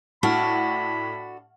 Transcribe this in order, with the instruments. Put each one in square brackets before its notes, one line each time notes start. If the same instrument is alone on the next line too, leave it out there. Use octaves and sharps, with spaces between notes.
[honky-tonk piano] A2 F6 [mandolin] D4 A4 [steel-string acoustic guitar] F#4 [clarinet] B5